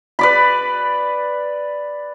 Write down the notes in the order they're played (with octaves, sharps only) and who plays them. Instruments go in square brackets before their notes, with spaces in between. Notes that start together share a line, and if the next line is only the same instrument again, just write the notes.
[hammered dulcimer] B4 D5 B5